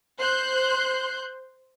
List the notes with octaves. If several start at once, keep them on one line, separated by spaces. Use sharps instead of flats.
C5 C6 F#6 G6